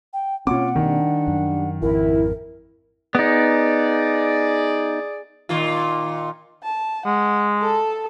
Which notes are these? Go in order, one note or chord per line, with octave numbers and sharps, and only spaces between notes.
G5
B2 A#3 C4 C#4 F4 F#5 D6
D#3 G3 D4
F#2
G#1 F2 E4 A#4
B3 D#4 G#4 D5
A#2 D#3 F4
A5
G#3 F#5
A4 A5